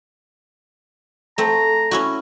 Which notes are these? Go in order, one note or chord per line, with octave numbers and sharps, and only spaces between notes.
A3 C4 A#5
C#4 E4 F#4